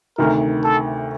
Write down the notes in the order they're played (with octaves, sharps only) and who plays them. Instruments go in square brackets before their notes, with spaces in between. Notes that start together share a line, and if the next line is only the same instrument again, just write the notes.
[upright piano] D2 C3 D#3 [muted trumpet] A#4
[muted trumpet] A4